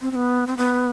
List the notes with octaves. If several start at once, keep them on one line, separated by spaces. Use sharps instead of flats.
C4
C4
B3
C4
B3